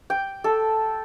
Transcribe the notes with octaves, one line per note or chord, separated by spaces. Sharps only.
G5
A4